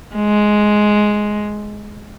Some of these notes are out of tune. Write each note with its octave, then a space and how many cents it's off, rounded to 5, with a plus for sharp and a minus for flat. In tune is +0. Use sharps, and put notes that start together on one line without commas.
G#3 +10